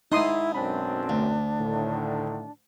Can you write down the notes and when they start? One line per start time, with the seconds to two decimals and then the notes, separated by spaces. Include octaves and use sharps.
0.12 G#2 D#4 E4 D#5 C6 D#6
0.55 B1 F#2 C4 D4 B5
1.09 D2
1.60 A2 D3 D#3